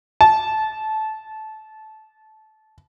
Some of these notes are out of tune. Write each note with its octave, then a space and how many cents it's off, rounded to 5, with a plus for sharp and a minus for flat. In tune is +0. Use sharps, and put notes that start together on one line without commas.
A5 -20